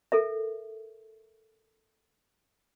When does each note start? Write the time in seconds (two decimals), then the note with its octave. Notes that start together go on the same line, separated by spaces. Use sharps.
0.12 A4 A#4 E5